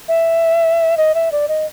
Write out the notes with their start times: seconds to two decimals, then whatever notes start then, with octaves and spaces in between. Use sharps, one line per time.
0.08 E5
0.97 D#5
1.15 E5
1.32 D5
1.48 D#5